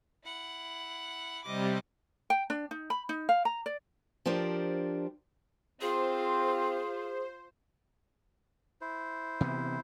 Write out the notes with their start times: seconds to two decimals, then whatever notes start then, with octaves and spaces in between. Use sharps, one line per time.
0.24 E4 F#5
1.44 C3 G3 D#5 D6
2.30 G5
2.50 D4
2.71 D#4
2.90 B5
3.09 D#4
3.29 F5
3.45 A#5
3.66 D5
4.26 F3 D4 G4 A#4 C5 D5
5.81 C4 F4 G#4 C5
8.81 E4 C5
9.41 C3 E3 B3